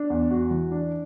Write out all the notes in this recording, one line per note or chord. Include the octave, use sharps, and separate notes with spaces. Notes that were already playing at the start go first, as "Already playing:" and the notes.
Already playing: D4
E2
F#4
E3
D4